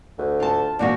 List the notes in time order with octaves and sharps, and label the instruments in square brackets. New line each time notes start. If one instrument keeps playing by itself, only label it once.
[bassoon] D2
[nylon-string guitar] F4 A5
[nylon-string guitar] E2 A#2 F#4 [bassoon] D4